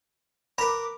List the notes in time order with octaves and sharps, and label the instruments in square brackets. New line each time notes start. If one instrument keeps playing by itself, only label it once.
[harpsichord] A#4 B4 [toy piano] B5 [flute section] D6